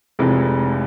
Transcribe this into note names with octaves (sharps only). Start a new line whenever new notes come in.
F1 F2 C3 E3 G#3